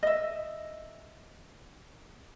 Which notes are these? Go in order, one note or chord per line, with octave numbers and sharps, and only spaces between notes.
D#5 E5